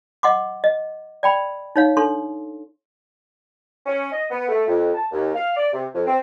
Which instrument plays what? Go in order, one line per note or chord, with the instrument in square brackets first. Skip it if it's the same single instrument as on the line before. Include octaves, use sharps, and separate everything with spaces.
[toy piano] D#5 F#5 C6 D6
D#5
D5 G5 B5
D#4 C#5 F5
D4 A4 C6
[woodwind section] C#4
D#5
B3
A3
F2
A5
D#2
F5
D5
C3
F2
C4